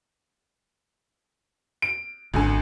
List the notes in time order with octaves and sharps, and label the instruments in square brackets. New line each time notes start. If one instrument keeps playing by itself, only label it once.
[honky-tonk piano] D7
[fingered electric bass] G#1 [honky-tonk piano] C#2 D3 G#5